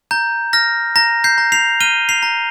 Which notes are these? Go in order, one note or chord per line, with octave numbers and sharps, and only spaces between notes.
A#5 G6
F6 A#6
A#5 A#6
G6 C7
A#5
C7 F7
F6 D#7 G7
C7 F7
A#5